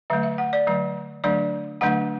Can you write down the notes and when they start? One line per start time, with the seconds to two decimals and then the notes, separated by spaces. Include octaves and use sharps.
0.10 D3 F#3 A3 E5
0.23 E5
0.38 F#5
0.53 D5
0.67 D3 F#3 A3
1.24 D3 F#3 A3 D4 D5
1.81 D3 F#3 A3 D4 F#5